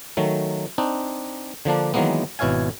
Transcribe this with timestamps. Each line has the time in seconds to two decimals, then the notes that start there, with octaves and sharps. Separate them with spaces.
0.17 D#3 F#3 A3
0.78 C4 D4 D#4
1.65 D3 F3 A#3 D4
1.94 D#3 E3 F#3 G#3 A#3 B3
2.39 G#1 B2 E4 C#5 F5 G#5